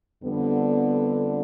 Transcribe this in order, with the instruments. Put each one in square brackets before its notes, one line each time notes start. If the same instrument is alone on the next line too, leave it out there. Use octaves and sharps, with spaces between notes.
[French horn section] F2 D3 G3 B3